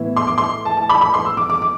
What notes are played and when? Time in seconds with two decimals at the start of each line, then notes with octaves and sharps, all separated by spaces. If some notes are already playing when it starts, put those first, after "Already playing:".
Already playing: A2 E3 B3 E4
0.16 C6
0.27 D6
0.38 C6
0.65 A5
0.77 A5
0.89 B5
1.01 B5
1.14 C6
1.25 E6
1.37 D6
1.50 D6
1.62 D6